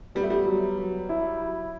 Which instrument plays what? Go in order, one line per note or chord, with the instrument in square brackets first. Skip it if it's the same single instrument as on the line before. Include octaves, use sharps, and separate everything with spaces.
[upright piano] G3 [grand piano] B3
[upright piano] A3
G3
[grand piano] F#3
F#3
E4